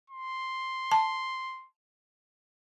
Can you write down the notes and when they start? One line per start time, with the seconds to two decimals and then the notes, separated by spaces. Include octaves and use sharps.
0.10 C6
0.92 A5